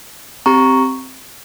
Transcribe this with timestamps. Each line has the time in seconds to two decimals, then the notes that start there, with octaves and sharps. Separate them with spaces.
0.46 C4 G4 A#5 C#6